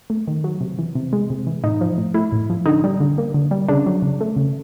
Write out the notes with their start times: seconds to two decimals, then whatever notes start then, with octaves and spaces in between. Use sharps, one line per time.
0.10 A3
0.27 D#3
0.44 F#3
0.61 C3
0.78 E3
0.95 C3
1.13 G#3
1.30 C3
1.47 E3
1.64 A2 D#4
1.81 F3
1.98 A2
2.14 A3 E4
2.32 A2
2.50 F3
2.66 D3 D#4
2.84 G3
3.00 D3
3.18 A#3
3.34 D3
3.51 G3
3.68 C#3 D4
3.86 F#3
4.02 C#3
4.20 A3
4.36 C#3